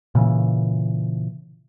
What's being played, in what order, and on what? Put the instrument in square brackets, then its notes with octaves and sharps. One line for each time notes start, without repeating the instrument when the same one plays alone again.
[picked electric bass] A#2 C#3 E3